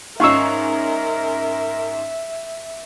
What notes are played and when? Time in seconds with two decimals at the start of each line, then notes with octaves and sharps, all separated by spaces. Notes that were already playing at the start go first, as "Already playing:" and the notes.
0.20 G#2 C#4 D#4 A#4 E5 F5 C#6 E6